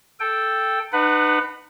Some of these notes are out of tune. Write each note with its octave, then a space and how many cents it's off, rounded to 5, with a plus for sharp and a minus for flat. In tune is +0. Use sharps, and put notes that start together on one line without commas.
A4 +0 G5 +0
D#4 -40 B4 +10 F#5 +0